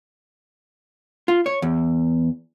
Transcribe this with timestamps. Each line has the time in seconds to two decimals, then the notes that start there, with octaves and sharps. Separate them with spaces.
1.28 F4
1.46 C#5
1.62 E2